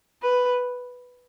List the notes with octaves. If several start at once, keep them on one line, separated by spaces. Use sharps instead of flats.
B4